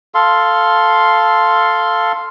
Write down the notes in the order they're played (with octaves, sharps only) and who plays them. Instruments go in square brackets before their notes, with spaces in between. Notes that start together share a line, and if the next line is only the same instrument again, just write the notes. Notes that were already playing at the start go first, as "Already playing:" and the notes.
[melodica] A4 F5 C6